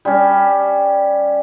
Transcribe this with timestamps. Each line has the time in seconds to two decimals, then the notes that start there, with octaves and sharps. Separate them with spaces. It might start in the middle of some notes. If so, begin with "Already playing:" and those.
0.05 G3 C#4